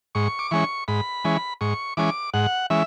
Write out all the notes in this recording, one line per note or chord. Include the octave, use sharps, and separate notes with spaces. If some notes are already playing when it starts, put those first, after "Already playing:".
G#2 C#6
D6
E3 G#3 C#4 C#6
G#2 B5
E3 G#3 C#4
G#2 C#6
E3 G#3 C#4 D6
G#2 F#5
E3 G#3 C#4 E5